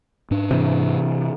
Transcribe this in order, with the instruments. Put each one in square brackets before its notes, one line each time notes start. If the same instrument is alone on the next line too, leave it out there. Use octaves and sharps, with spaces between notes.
[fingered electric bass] G#2 D4
[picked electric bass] C3 E3